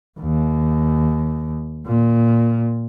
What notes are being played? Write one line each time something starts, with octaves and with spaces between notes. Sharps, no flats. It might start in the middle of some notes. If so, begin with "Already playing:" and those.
D#2
A#2